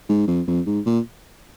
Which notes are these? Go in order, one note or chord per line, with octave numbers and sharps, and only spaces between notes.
G#2
F2
F2
G#2
A#2